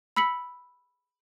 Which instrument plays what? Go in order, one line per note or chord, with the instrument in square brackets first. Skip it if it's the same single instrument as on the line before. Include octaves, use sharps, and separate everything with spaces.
[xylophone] B5 E6 B6 C#7 F#7